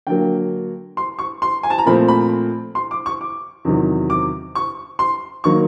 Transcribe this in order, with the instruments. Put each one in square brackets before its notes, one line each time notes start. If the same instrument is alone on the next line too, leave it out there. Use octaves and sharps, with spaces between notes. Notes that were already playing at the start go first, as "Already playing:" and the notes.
[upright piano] D3 F#3 A#3 G5
C6
C#6
C6
G#5
A5
A#5
A#2 F3 A3 C4 B5
B5
C6
D6
C#6
D6
E2 C3 D#3 F#3
D6
C#6
C6
D#3 F#3 A#3 C#6